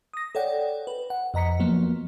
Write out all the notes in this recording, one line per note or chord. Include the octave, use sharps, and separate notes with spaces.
D#6 A#6
A4 C#5 D5 F#5 G5
B4
F#5
F2 D#5 A#5 B6 C#7
F3 F#3 A#3 B3